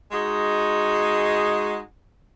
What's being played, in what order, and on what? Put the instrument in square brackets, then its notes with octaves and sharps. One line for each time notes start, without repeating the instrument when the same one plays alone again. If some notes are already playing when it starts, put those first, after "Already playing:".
[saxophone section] G#3 D#4 F#4 G#4